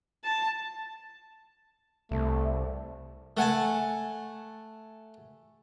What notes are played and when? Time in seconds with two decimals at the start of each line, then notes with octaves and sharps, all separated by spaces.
0.24 A5
2.11 C2 A3
3.37 A3 F#5 G#5 A5